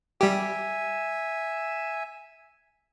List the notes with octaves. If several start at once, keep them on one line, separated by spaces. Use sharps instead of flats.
G3 G4 E5 G#5